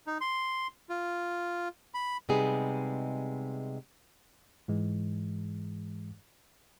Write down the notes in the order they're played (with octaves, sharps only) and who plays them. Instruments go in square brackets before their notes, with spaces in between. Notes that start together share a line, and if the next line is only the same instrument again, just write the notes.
[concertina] D#4
C6
F4
B5
[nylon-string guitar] C3 G3 G#3 B3 D#4 G#4
[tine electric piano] G#2 E3 G#3